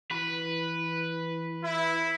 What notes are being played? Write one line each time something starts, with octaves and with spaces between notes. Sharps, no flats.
E3 B4
E4